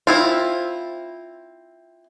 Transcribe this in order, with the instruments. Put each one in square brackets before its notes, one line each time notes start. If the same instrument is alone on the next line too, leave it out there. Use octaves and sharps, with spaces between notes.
[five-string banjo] C4 E4 F4